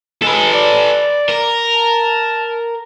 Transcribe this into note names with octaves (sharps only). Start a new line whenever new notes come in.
G#3 A4 B4
D5
A#4
A5